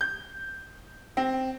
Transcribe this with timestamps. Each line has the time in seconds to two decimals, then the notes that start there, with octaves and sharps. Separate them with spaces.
0.01 G6
1.17 C4